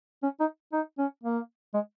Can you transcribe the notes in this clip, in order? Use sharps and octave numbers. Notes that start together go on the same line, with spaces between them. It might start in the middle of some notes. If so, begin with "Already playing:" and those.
C#4
D#4
D#4
C#4
A#3
G#3